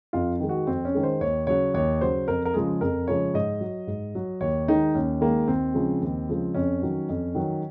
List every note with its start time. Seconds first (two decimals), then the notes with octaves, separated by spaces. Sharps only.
0.13 F2 F4
0.40 D#3 G#3
0.49 F#4
0.67 F2 C4
0.85 C#4
0.94 D#3 G#3
1.03 C5
1.20 D#2 C#5
1.47 C#3 F#3 C#5
1.74 D#2 C#5
2.01 C#3 F#3 C5
2.28 F2 A#4
2.45 A#4
2.54 C#3 F3 G#3 G#4
2.81 F2 A#4
3.08 C#3 F3 G#3 C#5
3.34 G#2 D#5
3.61 F#3
3.87 G#2
4.15 F#3
4.41 D#2 C#5
4.68 D#3 G#3 D#4
4.94 D#2 C#4
5.21 D#3 G#3 A#3
5.48 D#2 C4
5.74 C#3 F3 G#3
6.01 D#2
6.29 C#3 F3 G#3
6.54 F2 C#4
6.82 D#3 F#3
7.09 F2
7.35 D#3 F#3